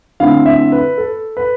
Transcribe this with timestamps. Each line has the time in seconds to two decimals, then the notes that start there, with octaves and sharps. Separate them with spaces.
0.20 D3 A3 C4 E4 F5
0.46 E5
0.72 B4
0.98 A4
1.37 B4